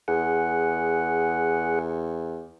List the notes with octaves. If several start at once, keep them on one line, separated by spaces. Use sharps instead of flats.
E2 G#4 F#5